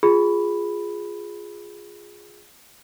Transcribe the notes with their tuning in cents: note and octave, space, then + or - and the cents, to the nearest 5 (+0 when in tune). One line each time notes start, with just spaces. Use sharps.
F4 +10 G#4 +0 B5 +0